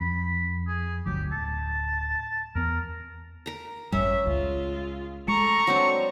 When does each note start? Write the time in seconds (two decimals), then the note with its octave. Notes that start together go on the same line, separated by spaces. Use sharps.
0.01 F2 B5
0.68 G#4
1.06 G1 D2 F#3 G4
1.32 D1 A5
2.55 E2 B3 A#4
3.46 A#4 A#5
3.92 G#1 F#2 G3 C#4 E5
4.27 C#2 G#3 F4
5.28 G#3 A3 A#5 C#6
5.67 F#3 C4 D4